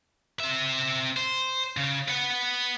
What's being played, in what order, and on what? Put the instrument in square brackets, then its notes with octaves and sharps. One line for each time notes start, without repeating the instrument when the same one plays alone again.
[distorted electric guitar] C4 E5
C5
C#3
B4 F#5